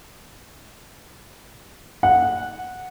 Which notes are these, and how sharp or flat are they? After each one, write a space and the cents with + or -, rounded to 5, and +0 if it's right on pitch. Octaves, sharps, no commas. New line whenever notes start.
F#5 -10